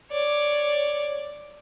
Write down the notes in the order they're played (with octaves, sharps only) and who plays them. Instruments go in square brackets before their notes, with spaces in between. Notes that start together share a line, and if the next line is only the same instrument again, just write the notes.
[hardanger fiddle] C#5 D5